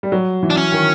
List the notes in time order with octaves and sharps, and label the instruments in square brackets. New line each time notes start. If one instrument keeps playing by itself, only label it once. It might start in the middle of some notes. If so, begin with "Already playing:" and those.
[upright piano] G3
F#3
E3
[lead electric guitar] D4
C#4
[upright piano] D#3